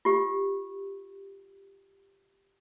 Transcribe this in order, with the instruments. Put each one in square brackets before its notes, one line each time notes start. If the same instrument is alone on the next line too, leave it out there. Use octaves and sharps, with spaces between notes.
[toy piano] F4 G4